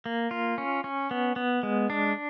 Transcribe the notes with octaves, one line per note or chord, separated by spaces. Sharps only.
A#3
F4
C#4
C#4
B3
B3
G#3
D4